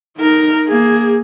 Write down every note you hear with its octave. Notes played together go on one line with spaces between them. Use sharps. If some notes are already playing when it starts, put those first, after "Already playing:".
D#4 A#4
A#3 G#4